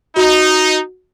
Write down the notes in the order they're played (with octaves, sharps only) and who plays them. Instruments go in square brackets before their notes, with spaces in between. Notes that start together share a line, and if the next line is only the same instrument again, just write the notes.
[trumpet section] D#4 [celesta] F#4